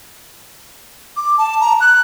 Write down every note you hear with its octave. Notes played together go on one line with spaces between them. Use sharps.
D6
A5
A#5
F#6